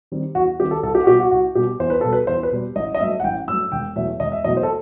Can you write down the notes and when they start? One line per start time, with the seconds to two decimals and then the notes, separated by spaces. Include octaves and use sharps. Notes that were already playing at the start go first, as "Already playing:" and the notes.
0.12 D#3 G3 C4
0.35 E2 F#4
0.60 D#3 G3 C4 G4
0.71 A4
0.83 C2 A4
0.95 G4
1.04 F#4
1.07 B2 G3 G4
1.20 F#4
1.31 C2 F#4
1.55 B2 G3 G4
1.80 E2 C5
1.90 B4
2.01 B2 G3 A4
2.13 B4
2.27 E2 C5
2.43 B4
2.52 B2 G3
2.76 A1 D#5
2.95 D#5
2.99 G2 F#3 A3 E5
3.20 F#5
3.24 A1 G5
3.48 G2 F#3 A3 E6
3.72 E1 G5
3.96 E2 B2 F#3 A3 E5
4.20 E1 D#5
4.32 E5
4.44 E2 B2 F#3 A3 D#5
4.57 C5
4.63 A4